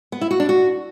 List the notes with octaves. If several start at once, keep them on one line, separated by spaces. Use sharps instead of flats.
B3
E4
F#4
D4
F#4